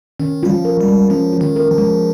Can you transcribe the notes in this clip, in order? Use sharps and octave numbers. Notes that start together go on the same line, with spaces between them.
D#3 C#4
G3 F4
F3
A#4
G3
G#3
F3 C#4
F4
D#3
A#4
F3
G#3